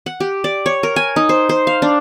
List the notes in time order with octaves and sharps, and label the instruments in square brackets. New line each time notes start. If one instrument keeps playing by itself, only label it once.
[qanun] F#5
G4
D5
C#5
A#4
G#5
D#4
C5
C5
F5
D4